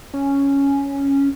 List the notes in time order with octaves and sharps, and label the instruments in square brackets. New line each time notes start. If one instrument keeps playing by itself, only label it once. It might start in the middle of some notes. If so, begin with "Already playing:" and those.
[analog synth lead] C#4